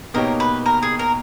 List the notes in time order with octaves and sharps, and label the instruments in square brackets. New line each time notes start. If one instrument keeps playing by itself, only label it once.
[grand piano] B2 A#3 D#4 G4 C#5 [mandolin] A#4
[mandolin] B4
A#4
G#4
A#4